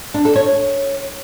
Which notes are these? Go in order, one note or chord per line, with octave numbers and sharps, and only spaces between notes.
D4
A4
C#5